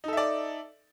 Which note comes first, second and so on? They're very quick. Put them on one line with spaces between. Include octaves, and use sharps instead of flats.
D#4 A4 E5 D5